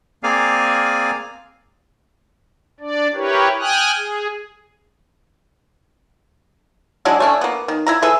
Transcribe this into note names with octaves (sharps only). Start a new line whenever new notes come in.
A#3 C4 G#4 D5 F5 G#5
D4 D5
E4 G4 A#4 B4 C#5
G5 G#5 D#6 F6 F#6
G#4
F#3 G#3 D4 E4
A3 C#4 D4
A#3 B3
D#3
E4 E5 A#5
G#4 A4 B4 E5